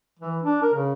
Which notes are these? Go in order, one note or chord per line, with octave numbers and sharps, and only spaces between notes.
E3
D4
A#4
C#3